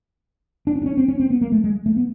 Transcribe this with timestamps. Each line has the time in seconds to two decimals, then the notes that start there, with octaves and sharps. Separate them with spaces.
0.67 D4
0.75 C#4
0.82 D4
0.86 C#4
0.97 C4
1.08 C#4
1.20 C4
1.30 B3
1.41 A#3
1.52 A3
1.64 G#3
1.86 A3
1.96 B3